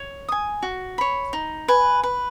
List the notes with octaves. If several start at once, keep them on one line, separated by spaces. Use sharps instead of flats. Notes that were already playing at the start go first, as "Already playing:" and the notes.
Already playing: C#5
G#5 D#6
F#4
C#5 B5
D#4
B4 G#5
B4